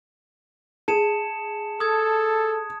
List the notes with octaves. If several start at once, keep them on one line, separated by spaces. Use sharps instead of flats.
G#4 A5 C#7 E7
A4 D#6 G#6